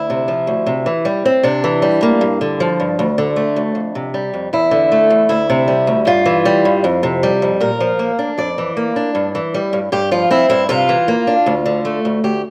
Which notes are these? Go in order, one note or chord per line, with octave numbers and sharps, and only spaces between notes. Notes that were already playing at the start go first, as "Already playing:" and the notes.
Already playing: D2 E4
C3
F3
D2
C3
E3
G3
C4
C3 D4
E3
G3
A#3
G2
D3
F3
G2
D2
D3
A3
D2
F2
C3
G3
F2
E2 E4
D3
A3
E2
D2 E4
C3
G3
D2
G2 F4
E3
G3
G2
F2
C3
G3
F2
A#2 A#4
F3
A#3
D4
F2 D5
E3
A#3
D4
G2
E3
G3
G2
G2 G4
F3 F4
C4 E4
G2 E4
C3 F4
E3
A#3
D4
D2
D3
A3
D2
D2 G4